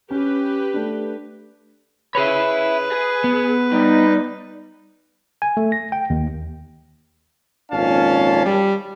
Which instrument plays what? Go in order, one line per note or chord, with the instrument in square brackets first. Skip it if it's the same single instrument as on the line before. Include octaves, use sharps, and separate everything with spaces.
[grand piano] C#4 [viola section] G4 B4
[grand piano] A3 D4
[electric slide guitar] G#4 C#5 [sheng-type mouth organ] B4 [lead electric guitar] E5 B5
[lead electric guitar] G#4
[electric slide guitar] B3
[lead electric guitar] G3 [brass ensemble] D#4
[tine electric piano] G#5
A3
A#6
G5
D#2
[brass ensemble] G#1 F2 A#2 C#4 F5 A5
G3